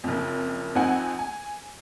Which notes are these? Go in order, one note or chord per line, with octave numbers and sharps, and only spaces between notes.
F#1 F2
F2 C4 D#4 F#5 G#5
G#5